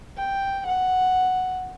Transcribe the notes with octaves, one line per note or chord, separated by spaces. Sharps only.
G5
F#5